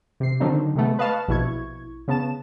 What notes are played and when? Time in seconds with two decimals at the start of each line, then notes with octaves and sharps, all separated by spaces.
0.20 C3 C7
0.40 D3 D#3 F#3 C4 D4 D#4
0.75 C3 G#3 A3 B3
0.99 B4 D#5 F5 A5 C#6 F6
1.28 A#1 B2 E4 C#6 G#6
2.08 C#3 B3 A5 E7